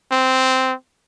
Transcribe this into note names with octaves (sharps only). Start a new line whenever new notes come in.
C4